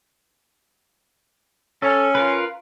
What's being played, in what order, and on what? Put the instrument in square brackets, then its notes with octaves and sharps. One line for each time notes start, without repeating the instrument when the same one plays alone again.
[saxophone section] C#4 [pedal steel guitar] A4
[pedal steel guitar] F4 A#4 B4